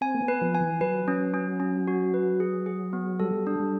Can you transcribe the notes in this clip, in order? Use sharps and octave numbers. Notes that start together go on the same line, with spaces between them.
C4 G#5
A#3
B3
B4
F3
G#5
E3
F#3 B4
C#4
C#4
C#4
F#4
B4
G#4
G#4
B3
G3 A4
D4
G3